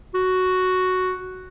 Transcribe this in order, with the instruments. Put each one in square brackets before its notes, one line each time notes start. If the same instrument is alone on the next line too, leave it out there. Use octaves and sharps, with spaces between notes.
[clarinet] F#4